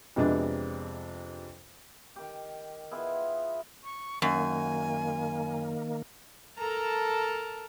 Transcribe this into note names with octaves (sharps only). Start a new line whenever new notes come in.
F2 C3 G#3 B3 D4
D#3 G4
B3 E4 F4 G#4
C#6
F#2 D#3 A#3 G#5
A4 A#4 A5 A#5